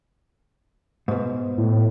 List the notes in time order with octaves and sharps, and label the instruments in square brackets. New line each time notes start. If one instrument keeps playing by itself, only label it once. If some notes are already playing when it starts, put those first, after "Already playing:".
[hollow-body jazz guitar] G#2 B2
[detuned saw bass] A2